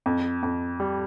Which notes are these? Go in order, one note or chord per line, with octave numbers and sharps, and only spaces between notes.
F2
F2
G3